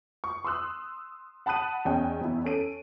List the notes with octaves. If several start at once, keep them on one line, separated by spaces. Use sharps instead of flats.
C#6
C6 D#6 E6 F#6
F#5 A5 B5 D#6 F#6 D#7
E2 C#4 D#5 G5 G#5
E2 E4
C#4 A4 D7 D#7